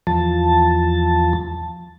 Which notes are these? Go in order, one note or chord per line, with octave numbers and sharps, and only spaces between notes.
E2 F3 A5